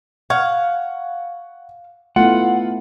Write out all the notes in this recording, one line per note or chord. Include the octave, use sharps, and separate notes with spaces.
F5 F#5 C#6 G#6
A3 B3 E4 F4 F#5